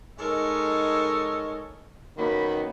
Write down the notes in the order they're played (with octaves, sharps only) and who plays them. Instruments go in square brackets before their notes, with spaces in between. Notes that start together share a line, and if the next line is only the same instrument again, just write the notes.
[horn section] G#3 D#4 A4 A#4 C#5 D#5
F#2 D#3 F#3 A#3 B3 B5